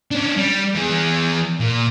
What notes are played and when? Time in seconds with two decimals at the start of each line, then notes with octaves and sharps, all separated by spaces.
0.11 C#4 D4
0.37 G3
0.75 E3 G#4
1.60 A#2